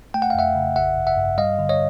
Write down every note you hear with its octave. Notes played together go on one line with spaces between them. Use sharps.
A3 G5
F#5
F5
F2 E5 F#5
C#3
A1 E5 F#5
G2
E5 F#5
G2
G3 D#5 F5
D3
C#5 D#5